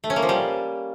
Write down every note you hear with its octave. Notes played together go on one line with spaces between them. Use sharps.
A3
C#4
A#3
F3
G3